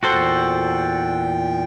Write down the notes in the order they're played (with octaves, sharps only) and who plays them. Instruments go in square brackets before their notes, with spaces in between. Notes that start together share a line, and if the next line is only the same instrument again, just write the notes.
[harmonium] E2 A#2 G5 [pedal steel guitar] F#4 A4 C5